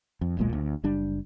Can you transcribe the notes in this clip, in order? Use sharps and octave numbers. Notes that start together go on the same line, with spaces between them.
F2
D#1 B1 A#2 G#3
D2
F#1 G3 D4